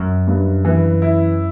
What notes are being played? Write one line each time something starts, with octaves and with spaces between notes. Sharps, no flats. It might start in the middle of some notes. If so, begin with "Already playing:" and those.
Already playing: F#2
G2
E3
E4